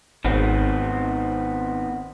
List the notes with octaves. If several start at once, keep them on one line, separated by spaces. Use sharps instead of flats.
G#1 D#3 B3 C4